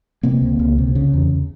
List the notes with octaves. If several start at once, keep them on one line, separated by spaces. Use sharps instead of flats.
C3 A#3 C4
C#2
C#2
C3
C#3
E2